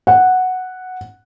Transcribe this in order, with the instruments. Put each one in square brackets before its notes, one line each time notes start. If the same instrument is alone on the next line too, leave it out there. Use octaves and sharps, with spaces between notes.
[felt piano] F#5